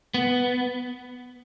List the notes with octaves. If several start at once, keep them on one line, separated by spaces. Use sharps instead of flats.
B3